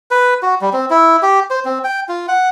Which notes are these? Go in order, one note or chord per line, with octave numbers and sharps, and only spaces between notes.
B4
F#4
G3
C4
E4
G4
C5
C4
G5
F4
F#5